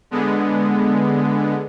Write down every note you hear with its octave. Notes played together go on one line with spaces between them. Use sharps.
D3 G#3 B3